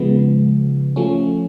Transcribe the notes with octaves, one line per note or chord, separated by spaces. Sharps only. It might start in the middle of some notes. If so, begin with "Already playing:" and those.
Already playing: C#3 F3 G#3 B3
F3 A3 C#4